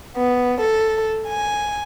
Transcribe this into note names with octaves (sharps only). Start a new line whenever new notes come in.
B3
A4
G#5